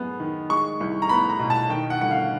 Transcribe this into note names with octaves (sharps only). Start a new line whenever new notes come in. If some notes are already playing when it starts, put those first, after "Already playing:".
Already playing: F#2 G#3 B3
D#3
G#3 C#6
C2
A#5
B3 B5
A#5
B2
A5
D#3 G5
F#5
G1 F#5
F5